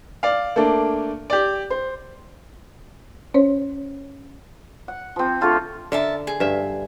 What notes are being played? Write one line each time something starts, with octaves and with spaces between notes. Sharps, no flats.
D5 F5
A3 A#3 D4
G4 D5
C5
C#4 C5 C#5
F#5
F3 C4
D3 A3 F4 A4
D3 A#4 E5 A5
G#4
G2 E5